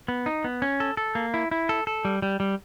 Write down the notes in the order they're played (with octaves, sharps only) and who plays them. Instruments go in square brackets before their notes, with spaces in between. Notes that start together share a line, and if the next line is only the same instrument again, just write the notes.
[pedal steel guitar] B3
D#4
B3
C#4
A4
A4
A#3
E4
E4
A4
A4
G3
G3
G3